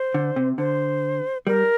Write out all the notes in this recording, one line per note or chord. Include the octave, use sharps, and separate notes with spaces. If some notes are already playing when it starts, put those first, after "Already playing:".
Already playing: C5
D3
C3
D3 C5
G3 A#4